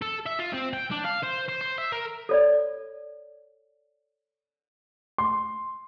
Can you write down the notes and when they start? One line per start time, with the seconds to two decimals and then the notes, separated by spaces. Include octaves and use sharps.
0.02 A4
0.26 E5
0.39 F4
0.53 C4
0.73 G5
0.91 D4
1.04 F5
1.23 C5
1.49 C5
1.61 C5
1.78 E5
1.92 A#4
2.29 A4 C#5 D5
5.18 C6